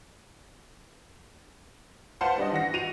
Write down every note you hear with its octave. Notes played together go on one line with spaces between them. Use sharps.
B4 C5 F5 F#5 A5 C6
G3 D4 D#5
E3 F#5 A#6
F#4 D#7 F7